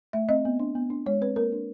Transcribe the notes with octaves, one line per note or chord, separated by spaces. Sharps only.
A3 E5
C4 D#5
B3
D4
B3
D4
G#3 C#5
C4 B4
A#3 A#4
D4